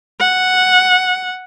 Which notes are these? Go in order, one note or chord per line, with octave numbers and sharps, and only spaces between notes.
F#5